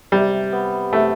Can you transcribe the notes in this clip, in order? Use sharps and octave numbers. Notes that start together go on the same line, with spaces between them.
C3 G3
B3
C3 A3